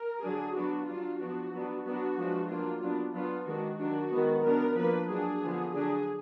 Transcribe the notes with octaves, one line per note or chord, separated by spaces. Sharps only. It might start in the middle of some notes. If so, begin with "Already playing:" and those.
Already playing: A#4
D3 F#3 D4 G#4
F#3 B3 D4 F#4
F#3 D4 F4
F3 B3 D4 F#4
F#3 B3 D4
F#3 B3 D4 F#4
F3 G#3 B3 D4
F#3 A#3 D4 F4
F#3 B3 D4
F#3 B3 D4 F4
D#3 G#3 D4 F#4
D#3 F#3 D4 F#4
D#3 G#3 B3
F#3 B3 D4 A#4
F3 A#3 D4 B4
F#3 D4 G#4
D3 F3 B3
D3 F#3 D4 G#4